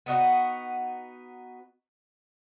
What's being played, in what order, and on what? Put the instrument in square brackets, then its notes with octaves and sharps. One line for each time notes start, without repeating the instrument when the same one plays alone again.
[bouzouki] B3 D#4 F#4